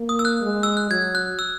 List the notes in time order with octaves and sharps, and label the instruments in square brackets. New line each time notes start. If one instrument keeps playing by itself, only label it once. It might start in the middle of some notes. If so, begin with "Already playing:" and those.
Already playing: [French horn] A#3
[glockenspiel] D#6
E6
F#6
[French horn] G#3
[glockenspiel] E6
F#6
[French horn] F#3 [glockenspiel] G#6
[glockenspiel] F#6
E6